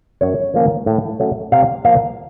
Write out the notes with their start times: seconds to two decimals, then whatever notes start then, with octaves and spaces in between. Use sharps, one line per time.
0.21 F#2 C#5
0.54 F3 A#3 C#4
0.86 A2
1.20 F#3 A3 C#4
1.52 C3 F5
1.85 F3 A#3 F5